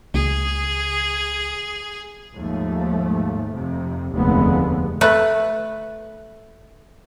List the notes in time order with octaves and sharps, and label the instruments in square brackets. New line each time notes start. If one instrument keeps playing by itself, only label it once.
[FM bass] C#2 [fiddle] G#4
[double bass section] D#2 G#2 F3 A3
F2 C3
F1 D#2 D3 G#3 A3 B3
[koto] A3 B4